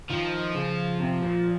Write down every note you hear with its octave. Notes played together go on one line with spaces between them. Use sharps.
D#3 F3
C#3
C3
A#2